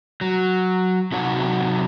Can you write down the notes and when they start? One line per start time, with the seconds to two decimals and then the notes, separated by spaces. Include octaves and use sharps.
0.21 F#3
1.12 C3 F#3 D#4 C#5 F#5